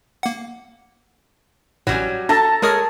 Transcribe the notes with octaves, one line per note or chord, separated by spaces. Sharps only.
A#3 F#5
A1 A2 F#3 G3 C#4
D4 A4 A5 A#5
G#3 G#4 A#4 C#5 D#6 F6